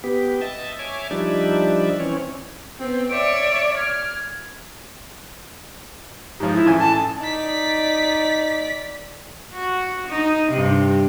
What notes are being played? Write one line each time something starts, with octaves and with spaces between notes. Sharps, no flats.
B3 G4
D#5 E5 A5
C#5 E5 G#5 D6
F3 G3 D4 D#4 D5 E5
E3 C4 C#4 C#5
B3 C4
C#5 D5 E5 D7
F6 G#6
G#2 F3
E4
A1 E3 G#5
A5
D#4 D5 B6
F#4
D#4
G2 C3